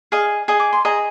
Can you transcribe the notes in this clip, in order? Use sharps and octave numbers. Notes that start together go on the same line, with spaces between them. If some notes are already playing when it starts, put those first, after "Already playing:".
G#4 D#5 F5
G#4 D#5 G#5
D6
C6
G#4 D#5 A#5